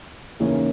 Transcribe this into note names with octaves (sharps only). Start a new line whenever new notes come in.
D#2 C#3 E3 A#3 C#4